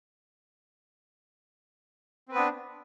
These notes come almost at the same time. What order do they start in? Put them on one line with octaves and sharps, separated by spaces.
C4 B4 B3 D4